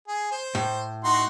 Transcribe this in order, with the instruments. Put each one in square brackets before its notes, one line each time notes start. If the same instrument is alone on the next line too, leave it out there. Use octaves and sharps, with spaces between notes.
[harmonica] G#4
C5
[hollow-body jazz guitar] A2
[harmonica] D#4 F#4 C6